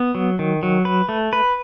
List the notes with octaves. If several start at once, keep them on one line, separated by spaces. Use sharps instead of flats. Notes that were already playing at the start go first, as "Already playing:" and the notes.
Already playing: B3
F#3
D#3
F#3
B4
A3
B4